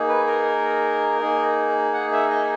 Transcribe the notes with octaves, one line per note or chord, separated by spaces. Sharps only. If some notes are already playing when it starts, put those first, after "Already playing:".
Already playing: A#3 D#4 G#4
B4
A#4
A#3 D#4 G#4
F#5
E5
D#5